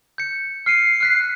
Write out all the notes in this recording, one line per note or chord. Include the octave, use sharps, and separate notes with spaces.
G6 C#7
F6 C7 C#7 D#7
F6 F#6 B6